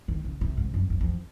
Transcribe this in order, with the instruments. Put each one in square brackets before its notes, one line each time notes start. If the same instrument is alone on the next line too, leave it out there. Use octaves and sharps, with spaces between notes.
[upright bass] D#3
C#3
C3
G#2
F#2
F#2
F2